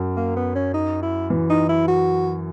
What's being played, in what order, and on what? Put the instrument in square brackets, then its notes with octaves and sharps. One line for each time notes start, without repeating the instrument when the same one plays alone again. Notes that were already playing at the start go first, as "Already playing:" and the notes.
Already playing: [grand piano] F#2 F#3
[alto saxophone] A#3
B3
C#4
D#4
E4
[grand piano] E3
[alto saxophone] D#4
E4
F#4